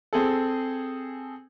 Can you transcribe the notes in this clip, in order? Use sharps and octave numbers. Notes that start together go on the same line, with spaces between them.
C4 G#4 A4